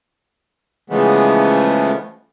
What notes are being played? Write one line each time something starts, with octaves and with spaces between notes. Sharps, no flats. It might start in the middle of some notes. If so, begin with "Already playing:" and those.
C#3 E3 F3 G#3 A3 B3